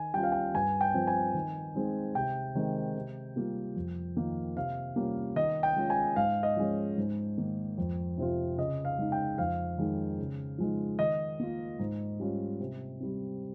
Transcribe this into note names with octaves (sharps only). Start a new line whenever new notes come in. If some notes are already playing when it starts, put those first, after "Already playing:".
Already playing: D#3 G#5
G3 C#4 F4 G5
F5
G5
G2 G#5
G5
F3 C4
G#5
D#3
G#3 C4 D#4
C3 G5
D#3 G#3 C4
C3
G3 A#3 F4
F2
D#3 A#3 F4
C3 F5
G3 A#3 C#4 F4
D#3 D#5
G5
G#3 C#4 F4
G#5
G#2 F5
D#5
F3 G#3 C#4
G#2
D#3 A#3
F2
C3 F3 C4 F4
C#3 D#5
F5
G#3 D#4
G5
F2 F5
D#3 G#3 D#4
C#3
F3 G#3 D#4
D#3 D#5
A#3 F4
G#2
G3 C#4 F4
C3
G3 C4